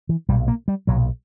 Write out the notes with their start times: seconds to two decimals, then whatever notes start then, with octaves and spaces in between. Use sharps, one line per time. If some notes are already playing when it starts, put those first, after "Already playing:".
0.09 E3
0.28 B1 A#2 G3
0.48 A#3
0.68 G3
0.87 B1 A#2 F#3